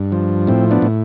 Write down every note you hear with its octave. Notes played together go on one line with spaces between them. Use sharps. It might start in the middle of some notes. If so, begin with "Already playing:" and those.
Already playing: G2
F3
A2 C4
B3 D4
A2